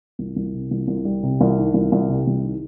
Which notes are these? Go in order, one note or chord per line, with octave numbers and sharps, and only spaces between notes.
C2
C2
C3
C2
C2
G3
C3
C2
D#3
C2
C2
C3
C2
D#3